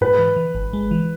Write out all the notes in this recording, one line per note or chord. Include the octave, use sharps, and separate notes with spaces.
G#2 B4
E3
E3
G#1
G#3
E3